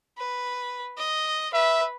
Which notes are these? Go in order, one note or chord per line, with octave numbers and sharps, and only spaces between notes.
B4
D#5
B4 E5